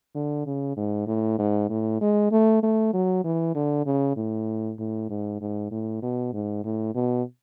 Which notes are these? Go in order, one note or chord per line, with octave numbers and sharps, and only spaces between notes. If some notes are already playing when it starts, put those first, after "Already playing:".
D3
C#3
G#2
A2
G#2
A2
G#3
A3
A3
F#3
E3
D3
C#3
A2
A2
G#2
G#2
A2
B2
G#2
A2
B2